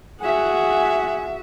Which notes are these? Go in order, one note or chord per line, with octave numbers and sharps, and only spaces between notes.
F#4 G#4 E5 F#5 G#5